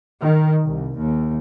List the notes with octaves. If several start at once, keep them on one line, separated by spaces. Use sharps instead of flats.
D#3
C2
D#2